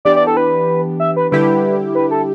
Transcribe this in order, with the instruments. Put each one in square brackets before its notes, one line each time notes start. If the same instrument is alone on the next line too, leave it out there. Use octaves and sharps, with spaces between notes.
[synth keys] E3 B3 D4 G4 [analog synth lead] D5
[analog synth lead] D5
A4
B4
E5
B4
[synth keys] D3 G3 E4 G4 [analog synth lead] B4
[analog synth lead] B4
A4